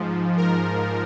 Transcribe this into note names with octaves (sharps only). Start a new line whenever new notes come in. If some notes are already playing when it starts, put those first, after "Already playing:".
Already playing: G#2 F3
A#4